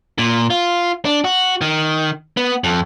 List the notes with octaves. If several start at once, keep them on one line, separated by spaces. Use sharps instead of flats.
A#2
F4
D4
F#4
D#3
B3
F2